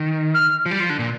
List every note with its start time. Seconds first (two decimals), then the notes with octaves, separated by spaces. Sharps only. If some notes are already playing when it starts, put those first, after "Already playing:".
Already playing: D#3
0.34 F6
0.66 F3
0.71 G3
0.80 F3
0.90 D3
0.99 A#2